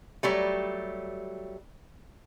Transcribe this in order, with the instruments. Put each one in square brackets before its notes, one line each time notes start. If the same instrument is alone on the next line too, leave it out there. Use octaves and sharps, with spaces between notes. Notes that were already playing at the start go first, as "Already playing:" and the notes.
[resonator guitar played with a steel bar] F#3 G3 A3